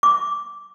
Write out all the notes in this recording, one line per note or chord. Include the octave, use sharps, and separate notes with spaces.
D6